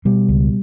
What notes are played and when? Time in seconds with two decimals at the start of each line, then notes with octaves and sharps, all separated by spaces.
0.05 B2 G3
0.29 C#2